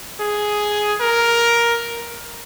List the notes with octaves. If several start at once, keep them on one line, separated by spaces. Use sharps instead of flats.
G#4
A#4